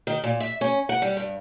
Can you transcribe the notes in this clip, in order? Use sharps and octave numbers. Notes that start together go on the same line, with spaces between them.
D#3
A#2
E5
C#4
F#5
G3
G2